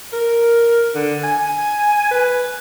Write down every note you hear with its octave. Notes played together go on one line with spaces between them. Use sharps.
A#4
D3
G#5
B4